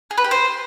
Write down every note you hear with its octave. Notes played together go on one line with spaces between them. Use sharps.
G#4
B4
G4
C5